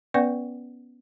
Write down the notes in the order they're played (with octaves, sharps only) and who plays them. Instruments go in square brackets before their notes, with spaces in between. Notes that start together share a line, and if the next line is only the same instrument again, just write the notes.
[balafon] B3 C#4 B4 D5 F#5 C#6